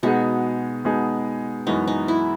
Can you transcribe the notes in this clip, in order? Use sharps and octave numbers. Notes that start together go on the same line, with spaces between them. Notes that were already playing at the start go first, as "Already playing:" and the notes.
B2 G#3 B3 D#4 F#4 G#4
B2 G#3 B3 D#4 G#4
F#2 E3 G#3 B3 D#4 F#4
D#4
E4